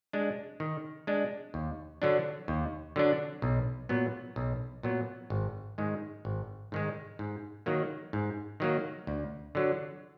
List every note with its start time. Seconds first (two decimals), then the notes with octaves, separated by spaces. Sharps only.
0.13 G#3 D4
0.60 D#3
1.07 G#3 D4
1.54 D#2
2.02 D3 F#3 D4
2.48 D#2
2.96 D3 F#3 D4
3.42 B1
3.89 A#2 F#3 B3
4.36 B1
4.83 A#2 F#3 B3
5.30 G#1
5.78 G#2 D#3 G#3
6.25 G#1
6.72 G#2 D#3 G#3
7.19 G#2
7.66 D#3 F#3 A#3
8.13 G#2
8.60 D#3 F#3 A#3
9.07 D2
9.55 D3 F#3